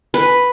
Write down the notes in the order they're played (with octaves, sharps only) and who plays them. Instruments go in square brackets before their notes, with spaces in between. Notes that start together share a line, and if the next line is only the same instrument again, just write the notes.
[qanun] B4